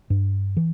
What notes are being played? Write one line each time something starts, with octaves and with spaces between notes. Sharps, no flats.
G2
E3